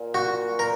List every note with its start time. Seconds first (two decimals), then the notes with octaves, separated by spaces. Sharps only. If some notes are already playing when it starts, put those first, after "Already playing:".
Already playing: A#2
0.14 F#4
0.59 A#4